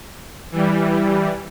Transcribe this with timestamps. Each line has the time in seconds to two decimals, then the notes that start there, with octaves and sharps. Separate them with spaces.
0.52 E3 G3